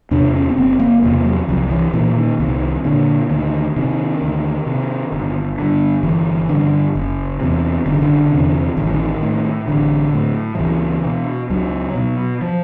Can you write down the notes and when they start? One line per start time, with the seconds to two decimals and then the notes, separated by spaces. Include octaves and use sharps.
0.11 E2 C3 D4
0.34 C#4
0.49 B3
0.57 F#1 C4
0.80 A#3
1.03 E2 C3 A#3
1.25 F#3
1.48 C2 F3
1.71 E3
1.93 A#2 E3
2.17 D#3
2.39 C2 D#3
2.85 A#2 D3
3.30 D2 D#3
3.76 C3 D#3
4.21 D2
4.66 C3
5.12 G1
5.59 G2 D3
6.03 G1 E3
6.49 G2 D3
6.95 F#1
7.40 E2 C3
7.86 F#1 D3
7.94 D#3
8.02 D3
8.32 E2 C3
8.77 A1 D#3
8.86 E3
8.94 D#3
9.22 A2
9.68 A1 D3
10.14 A2
10.55 F3
10.58 C#2 E3
11.04 B2
11.50 C#2 F#3
11.95 B2
12.41 F3